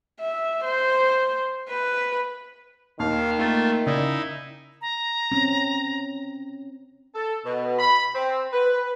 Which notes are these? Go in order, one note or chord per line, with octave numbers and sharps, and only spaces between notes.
E5
C5
B4
D#2 D#3 F5
A3 A#3 F4
C#3 D#4 E4 D5
A#5
C4 C#4
A4
B2
B5
C4
B4